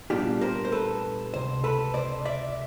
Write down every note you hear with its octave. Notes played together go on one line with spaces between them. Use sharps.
A#2 G3 B3 D4 F4 G4
A#4 C5
C5
A4 B4
C#2 C3 C5
A4 B4
C5 D5
D5 E5